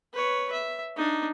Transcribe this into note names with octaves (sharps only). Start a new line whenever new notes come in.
B4 C#5
E5
D4 D#4